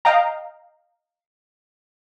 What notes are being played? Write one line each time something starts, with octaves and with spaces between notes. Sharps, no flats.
D#5 F5 G5 A#5